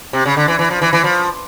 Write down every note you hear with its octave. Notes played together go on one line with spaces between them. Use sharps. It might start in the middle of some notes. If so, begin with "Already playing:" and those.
C3
C#3
D3
E3
E3
F3
E3
E3
F3